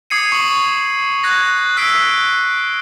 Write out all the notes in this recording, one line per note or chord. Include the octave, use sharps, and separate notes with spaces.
D6 D#6 G#6 C7 C#7 D#7
C#6 D6 F#7
F#6 G#6 A#6
E6 F#6 B6 C7 D7